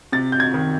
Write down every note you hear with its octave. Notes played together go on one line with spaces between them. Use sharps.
C3 A6
G6
G#6
D#3